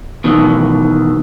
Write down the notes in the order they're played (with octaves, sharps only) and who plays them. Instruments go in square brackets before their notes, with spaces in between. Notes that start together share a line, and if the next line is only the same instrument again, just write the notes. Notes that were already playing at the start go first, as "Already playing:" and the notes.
[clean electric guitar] B2 D#3 E3